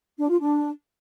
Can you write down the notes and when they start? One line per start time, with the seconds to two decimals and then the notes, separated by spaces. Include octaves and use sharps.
0.18 D4
0.29 F4
0.40 D4